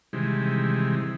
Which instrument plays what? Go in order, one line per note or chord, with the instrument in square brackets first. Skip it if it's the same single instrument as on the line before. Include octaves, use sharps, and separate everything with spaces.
[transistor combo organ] C3 D#3 E3 G3 G#3